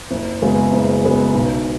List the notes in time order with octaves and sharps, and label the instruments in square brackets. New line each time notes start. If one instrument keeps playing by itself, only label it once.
[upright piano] F#1
F#2 C#3 G#3 B3
F#1
F#2 C#3 G#3 B3
B1